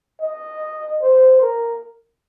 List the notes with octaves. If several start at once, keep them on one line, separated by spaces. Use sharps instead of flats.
D#5
C5
A#4